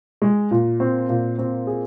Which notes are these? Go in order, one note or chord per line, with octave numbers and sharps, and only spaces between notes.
G#3
A#2
C4
A#2
C4
G#4